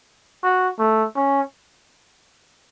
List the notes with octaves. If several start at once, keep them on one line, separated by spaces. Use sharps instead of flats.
F#4
A3
C#4